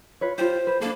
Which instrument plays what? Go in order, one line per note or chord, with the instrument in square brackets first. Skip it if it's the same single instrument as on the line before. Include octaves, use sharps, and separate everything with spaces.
[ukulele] F4 B4 C#5
[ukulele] F4 G4 [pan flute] C5
[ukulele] B4
[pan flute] A#3 [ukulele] D4 A4